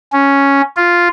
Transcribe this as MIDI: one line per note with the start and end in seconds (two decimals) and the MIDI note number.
0.13 0.62 61
0.77 1.08 65